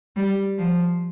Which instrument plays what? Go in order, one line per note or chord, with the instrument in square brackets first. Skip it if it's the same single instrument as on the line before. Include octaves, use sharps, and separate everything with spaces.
[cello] G3
F3